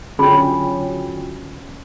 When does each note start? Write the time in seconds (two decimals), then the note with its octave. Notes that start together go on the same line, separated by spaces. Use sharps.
0.19 D3 F#3 C#4 F4 G#4 G5 B5